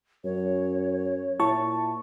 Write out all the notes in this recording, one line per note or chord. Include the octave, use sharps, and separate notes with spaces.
F#2 C#5
A#2 E4 A5 C#6